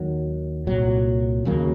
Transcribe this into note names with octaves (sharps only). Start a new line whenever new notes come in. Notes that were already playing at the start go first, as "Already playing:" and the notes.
Already playing: D#2 D#3 F#3
C2 A#2 F#3
D#2 C#3 F#3 A#3